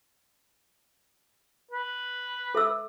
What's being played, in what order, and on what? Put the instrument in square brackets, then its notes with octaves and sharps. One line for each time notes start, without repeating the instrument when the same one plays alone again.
[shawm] B4
[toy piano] A4 E5 E6